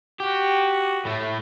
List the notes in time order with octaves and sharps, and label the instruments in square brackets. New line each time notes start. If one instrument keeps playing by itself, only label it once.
[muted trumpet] F#4 [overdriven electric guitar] G4
[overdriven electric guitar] A2 A3